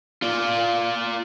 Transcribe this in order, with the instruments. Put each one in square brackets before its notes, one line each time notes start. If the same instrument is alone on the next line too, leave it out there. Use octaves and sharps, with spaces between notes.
[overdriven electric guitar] F4 D5